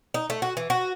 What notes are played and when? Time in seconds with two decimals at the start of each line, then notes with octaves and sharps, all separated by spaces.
0.14 D#4
0.30 A3
0.42 F#4
0.57 E3
0.70 F#4